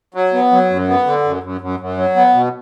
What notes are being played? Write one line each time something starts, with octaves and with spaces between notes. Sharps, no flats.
F#3
B3
F#3
F#2
B3
D3
F#2
F#2
F#2
F#2
F#3
B3
B2